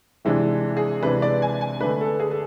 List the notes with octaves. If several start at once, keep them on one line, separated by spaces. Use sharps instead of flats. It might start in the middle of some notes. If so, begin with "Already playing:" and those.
C3 E3 G#3 D4
G#4
C3 E3 G#3 D4 B4
D5
G#5
G#5
D3 A3 D4 B4
A4
G#4
A4